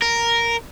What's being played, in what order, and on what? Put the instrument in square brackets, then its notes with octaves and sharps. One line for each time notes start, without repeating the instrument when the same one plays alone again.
[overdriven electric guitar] A#4